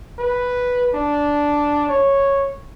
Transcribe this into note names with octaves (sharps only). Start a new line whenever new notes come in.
B4
D4
C#5